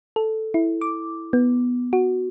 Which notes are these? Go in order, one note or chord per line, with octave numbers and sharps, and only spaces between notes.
A4
E4
D6
B3
F#4